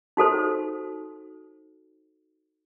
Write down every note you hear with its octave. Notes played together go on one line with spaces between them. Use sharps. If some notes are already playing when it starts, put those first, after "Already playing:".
D#4 F#4 A4 C5